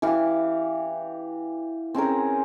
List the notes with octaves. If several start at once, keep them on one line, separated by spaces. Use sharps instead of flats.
E3 G4 F5 F#5
C4 C#4 G#4 A#4